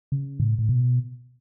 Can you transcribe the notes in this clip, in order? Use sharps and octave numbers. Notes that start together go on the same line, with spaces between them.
C#3
A2
A2
B2